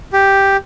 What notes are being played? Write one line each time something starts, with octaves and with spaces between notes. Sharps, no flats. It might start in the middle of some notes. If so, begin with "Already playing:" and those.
G4